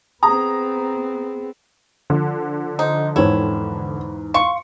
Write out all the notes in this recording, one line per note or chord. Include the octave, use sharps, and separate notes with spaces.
B3 C4 G#4 A#5 D#6
D3 F3
D#4 C5
E2 G#2 E4 A4 C#5 G5
F5 C6 C#6 C#7